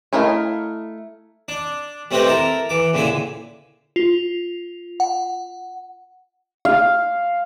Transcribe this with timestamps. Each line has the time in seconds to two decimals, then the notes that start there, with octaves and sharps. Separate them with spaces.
0.13 A3 E4 A#4 D#5 F5
1.48 D4
2.11 G3 A3 C4 G4 B4 D#5
2.27 E4 A4 A#4
2.69 E3 D6
2.94 C#2 A#2 D3 E4 G#5
3.96 F4
5.00 F#5
6.65 F5